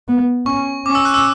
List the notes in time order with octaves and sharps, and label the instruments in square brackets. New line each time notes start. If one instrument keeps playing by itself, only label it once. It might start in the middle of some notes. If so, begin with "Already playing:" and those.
[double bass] B3
[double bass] C#4 [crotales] C#6
[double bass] C#4 [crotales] D6
[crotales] E6
F#6
E6